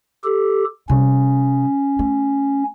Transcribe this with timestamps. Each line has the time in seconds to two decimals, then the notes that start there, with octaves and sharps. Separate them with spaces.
0.24 G4 A4
0.89 C3 G3 C#4
1.99 A3